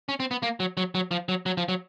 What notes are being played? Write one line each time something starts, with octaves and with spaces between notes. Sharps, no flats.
C#4
C4
B3
A#3
F#3
F#3
F#3
F3
F#3
F#3
F3
F#3